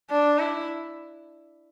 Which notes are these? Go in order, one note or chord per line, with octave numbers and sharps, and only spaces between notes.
D4
E4